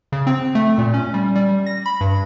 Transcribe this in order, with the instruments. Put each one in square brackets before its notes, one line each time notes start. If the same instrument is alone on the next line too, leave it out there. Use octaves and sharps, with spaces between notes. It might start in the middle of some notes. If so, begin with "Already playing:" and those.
[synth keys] C#3
C4
A3
A#2
C#4
G3
G3
A#6
B5
G2